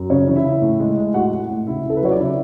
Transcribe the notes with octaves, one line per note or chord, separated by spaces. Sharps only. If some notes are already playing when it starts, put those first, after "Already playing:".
Already playing: F#2
C#3 C#4 C#5
E3
E4 E5
C#3
A2
G#3
G#3
A2 F#4 F#5
A2
A2
C#3 E4 E5
C#3 A4
B4
F#3 C#5
D5
C#3 E4 E5